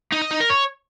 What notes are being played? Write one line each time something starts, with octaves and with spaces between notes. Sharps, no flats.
D#4
D#5
D#4
A#4
C#5